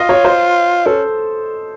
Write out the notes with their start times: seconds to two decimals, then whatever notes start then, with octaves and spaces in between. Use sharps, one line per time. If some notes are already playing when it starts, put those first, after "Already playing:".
Already playing: F4 D#5
0.09 C#5
0.25 C5
0.86 C#4 A4